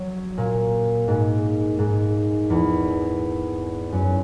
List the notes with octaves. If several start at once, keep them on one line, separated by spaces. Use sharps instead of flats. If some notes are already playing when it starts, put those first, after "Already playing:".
Already playing: F#3
A#2
G#2
G#2
E2
F#2